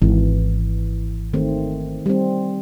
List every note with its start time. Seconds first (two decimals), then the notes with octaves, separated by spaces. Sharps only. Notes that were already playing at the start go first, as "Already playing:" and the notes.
0.02 G#1 E3
1.34 D#3 A3 C4
2.06 G3 C4